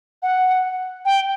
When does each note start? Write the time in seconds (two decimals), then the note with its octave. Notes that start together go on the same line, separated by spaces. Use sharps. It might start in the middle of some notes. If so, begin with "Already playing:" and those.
0.23 F#5
1.05 G5